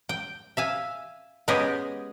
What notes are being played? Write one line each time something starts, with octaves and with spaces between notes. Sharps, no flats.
G5
E5 F5 G#5
G#3 B3 C#4 G4 G#4 D#5